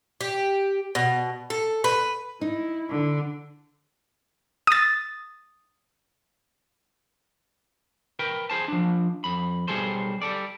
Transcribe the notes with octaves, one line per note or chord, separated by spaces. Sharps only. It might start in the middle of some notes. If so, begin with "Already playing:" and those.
G4
B2
A4
B4
D#4 E4
D3
D#6 A6
A#4 B4 G5
G#4 C5 A5
F3 D4
F2 B5
B1 C3 G3 G#4 A4 C5
G3 A4 D5